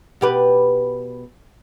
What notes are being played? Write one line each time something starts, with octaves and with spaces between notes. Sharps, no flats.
B2 G4 B4